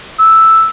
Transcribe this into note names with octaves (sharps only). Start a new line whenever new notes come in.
E6